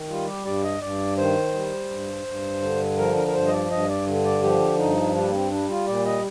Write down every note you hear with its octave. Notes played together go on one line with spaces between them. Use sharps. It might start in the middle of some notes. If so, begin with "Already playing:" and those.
Already playing: D#3
G3 F4
G4
G2 D5
D#5
G2 D5
D#3 C5
G3
G2
G2
D3
F3 A#4
A#4
A#4
G2 C5
D#5
D5
G2 D#5
D5
D3
D5
F3 G4
G2 D#4
G3 D4
A#3
C4
G3 D4
F4
A#2 D5
D#5